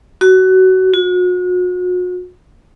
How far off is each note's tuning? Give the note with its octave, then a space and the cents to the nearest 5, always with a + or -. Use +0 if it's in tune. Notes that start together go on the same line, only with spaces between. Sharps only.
F#4 +20
F#4 -40